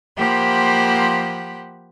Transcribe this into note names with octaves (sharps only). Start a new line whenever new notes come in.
F3 A#3 G4 C5 F#5 B5